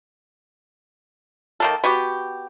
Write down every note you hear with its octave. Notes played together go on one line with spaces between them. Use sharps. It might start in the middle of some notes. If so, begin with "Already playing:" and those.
D#3 A#3 A4
B3 F#4 G4